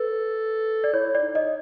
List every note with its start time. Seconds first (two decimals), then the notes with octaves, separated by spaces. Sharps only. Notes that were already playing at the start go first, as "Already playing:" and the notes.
Already playing: A4 B4
0.84 D5
0.93 E4 C#5
1.15 D5
1.21 D#4
1.35 D#5